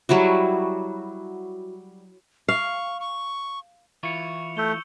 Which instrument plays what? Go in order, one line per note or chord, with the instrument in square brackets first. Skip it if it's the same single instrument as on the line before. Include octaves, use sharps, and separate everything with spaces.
[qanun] F#3 G3 E4 F#4
[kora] F5 [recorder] C#6
[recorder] C#6
[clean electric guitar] E3 E4 F4 [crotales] C#6 C#7 F7
[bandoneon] A3 [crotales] E6 G6 G7